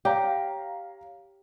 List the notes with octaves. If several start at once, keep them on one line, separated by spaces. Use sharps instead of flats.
G4 C#5 F5 A#5